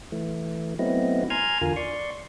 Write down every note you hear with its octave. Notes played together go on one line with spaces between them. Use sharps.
E3 A3
F#3 A3 B3 C4 E4 D#5
G#5 A#5 C6 F6 G#6
E2 D3 F4 A#4 G#5
D5 C6 C#6